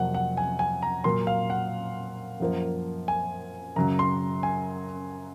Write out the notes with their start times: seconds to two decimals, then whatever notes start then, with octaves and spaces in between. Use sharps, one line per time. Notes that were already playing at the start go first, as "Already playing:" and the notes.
Already playing: F2 C3 F#3 A#3 F#5
0.14 F#5
0.37 G#5
0.59 G#5
0.82 A#5
1.04 A#2 F#3 A#3 C6
1.27 F5
1.50 F#5
2.40 F#2 F3 A#3
3.08 G#5
3.76 F#2 C#3 F#3 A#5
3.99 C6
4.43 G#5